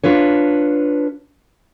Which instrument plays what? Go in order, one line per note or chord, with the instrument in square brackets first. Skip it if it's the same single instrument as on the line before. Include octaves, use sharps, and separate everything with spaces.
[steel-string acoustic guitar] D4 F4 B4 C#5